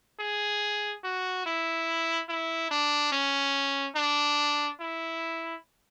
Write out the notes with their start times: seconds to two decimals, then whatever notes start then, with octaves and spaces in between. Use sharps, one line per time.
0.20 G#4
1.04 F#4
1.46 E4
2.29 E4
2.71 D4
3.12 C#4
3.96 D4
4.80 E4